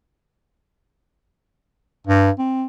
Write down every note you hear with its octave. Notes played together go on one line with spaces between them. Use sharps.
G2
C4